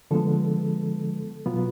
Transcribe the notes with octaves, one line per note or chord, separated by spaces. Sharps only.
D3 F3 G#3 B3 A4
B2 F#3 B3 F4